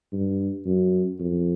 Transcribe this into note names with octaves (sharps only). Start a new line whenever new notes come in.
G2
F#2
F2